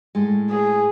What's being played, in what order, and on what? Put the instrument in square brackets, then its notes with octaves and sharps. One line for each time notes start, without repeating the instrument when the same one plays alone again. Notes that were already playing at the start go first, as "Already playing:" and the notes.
[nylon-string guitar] A2 G#3
[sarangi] G#4